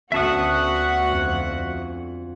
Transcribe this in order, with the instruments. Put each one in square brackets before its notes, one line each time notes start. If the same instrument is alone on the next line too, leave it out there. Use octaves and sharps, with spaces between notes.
[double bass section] D2 [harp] B3 C#4 [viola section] F#4 F#5 [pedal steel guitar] E5 A5 D#6
[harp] F2